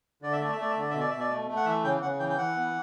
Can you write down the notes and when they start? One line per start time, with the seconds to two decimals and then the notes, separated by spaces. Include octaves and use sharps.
0.22 D3 D5
0.32 E5
0.41 A3 D5
0.52 E5
0.58 A3 D5
0.71 E5
0.77 D3 D5
0.90 B2 E5
1.00 D5
1.10 B2 E5
1.20 D5
1.30 A3
1.48 A3
1.56 F#5
1.65 E3 E5
1.84 C#3 G5
2.02 C#3 F#5
2.19 E3 G5
2.29 G5
2.38 E3 F#5
2.56 B3